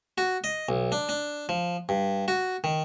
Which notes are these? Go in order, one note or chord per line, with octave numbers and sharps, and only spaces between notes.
F#4
D#5
B1
D4
D4
F3
G2
F#4
D#3